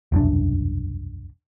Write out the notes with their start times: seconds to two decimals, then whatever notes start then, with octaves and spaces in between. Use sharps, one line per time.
0.12 E1 C2 F#2 D4